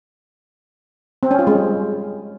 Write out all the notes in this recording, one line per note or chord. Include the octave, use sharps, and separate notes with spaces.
C4
C#4
F4
G#3
G3